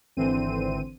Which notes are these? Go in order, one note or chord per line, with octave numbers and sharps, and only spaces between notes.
G#1 D3 E3 C4 C5 D#7